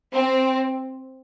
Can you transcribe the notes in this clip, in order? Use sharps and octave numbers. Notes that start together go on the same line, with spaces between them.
C4